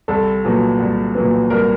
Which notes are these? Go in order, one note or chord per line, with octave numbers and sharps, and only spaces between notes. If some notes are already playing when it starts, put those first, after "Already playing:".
C2 A4
A#2 F#3 B3
C2
A#2 F#3 B3
C2 A#4